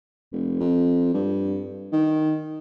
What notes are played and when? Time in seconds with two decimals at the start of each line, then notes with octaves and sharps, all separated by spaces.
0.32 F1
0.60 F2
1.14 G2
1.92 D#3